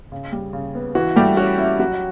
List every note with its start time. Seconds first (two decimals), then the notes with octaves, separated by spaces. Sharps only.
0.12 C#3
0.32 G3
0.53 C#3
0.75 B3
0.95 E3 F#4
1.16 G3 A3 G4
1.37 C#4 F#4
1.58 C#4 E4
1.79 F#3 F#4